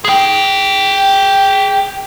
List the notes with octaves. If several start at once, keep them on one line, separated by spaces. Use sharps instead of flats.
G#4 G5